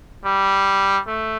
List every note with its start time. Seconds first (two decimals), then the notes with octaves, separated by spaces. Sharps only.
0.25 G3
1.07 A3